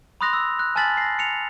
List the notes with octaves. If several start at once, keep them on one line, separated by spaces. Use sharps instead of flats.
B5 C6 D#6 F#6 A#6 F7
E6
F#6
G#5 A5 F6 A6 B6 F#7
A#6 C7
C#7 F7